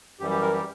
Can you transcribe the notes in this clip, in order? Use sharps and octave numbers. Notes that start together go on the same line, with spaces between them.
F#2 E3 G3 G4
G4
A#4
G4